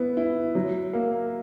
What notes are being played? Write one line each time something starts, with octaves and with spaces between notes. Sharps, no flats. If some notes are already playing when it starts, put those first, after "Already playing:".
Already playing: B3 E4
E4
F#3
A#3